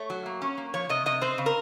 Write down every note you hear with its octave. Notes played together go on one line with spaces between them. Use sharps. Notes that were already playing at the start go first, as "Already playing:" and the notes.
Already playing: A3 C#5
F#3
A#3
C#4
A#3
F3 C#5
C3 D#5
C3 D#5
C4 C5
C#3
A#4